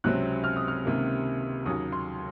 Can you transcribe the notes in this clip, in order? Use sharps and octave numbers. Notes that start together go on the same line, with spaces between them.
C#2 C3 F#3 C4 F#6
F6
D#6
F6
C#2 C3 D#3 A#3
D#2 C#3 F#3 C#4 D#6
C6